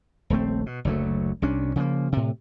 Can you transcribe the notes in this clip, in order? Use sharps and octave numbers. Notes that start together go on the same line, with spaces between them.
D#1 A#1 A3 C4
B2
F#1 D2 F#3 A3
C2 C3 C#4 D4
C#3 F3 A3 A#3
A2 C3